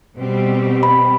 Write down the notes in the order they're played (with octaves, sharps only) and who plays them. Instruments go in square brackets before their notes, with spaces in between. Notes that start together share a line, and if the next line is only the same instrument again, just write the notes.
[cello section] B2 G3 C4 G4
[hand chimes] B5